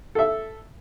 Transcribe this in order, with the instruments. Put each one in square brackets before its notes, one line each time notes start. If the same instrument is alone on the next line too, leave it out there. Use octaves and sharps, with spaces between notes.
[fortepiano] A4 E5